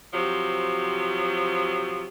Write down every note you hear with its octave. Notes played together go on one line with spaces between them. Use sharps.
C3 F3 F#3